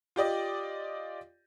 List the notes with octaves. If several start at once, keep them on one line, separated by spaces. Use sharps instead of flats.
F4 G4 D5 D#5